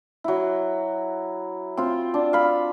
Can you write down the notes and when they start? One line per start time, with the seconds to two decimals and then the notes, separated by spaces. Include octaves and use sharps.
0.24 F#3 E4
1.77 C4 F4
2.14 D4
2.33 F5 B5